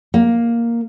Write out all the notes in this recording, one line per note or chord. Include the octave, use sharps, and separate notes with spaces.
A#3